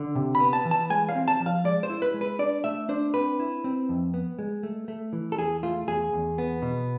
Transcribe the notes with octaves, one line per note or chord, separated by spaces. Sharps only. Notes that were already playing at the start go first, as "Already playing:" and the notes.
Already playing: D3
C3
B5
B3
A5
E3
A5
G#3 G#5
F5
C4
A5
F3
F5
G#3 D5
C5
E4
B4
G#3
B4
D4 D5
A3 E5
D4 C5
C4 B4
E4
C4
F2
B3
G#3
A3
A3
E3
A4
E2 G#4
A3 F4
E2 G#4
E2
B3
B2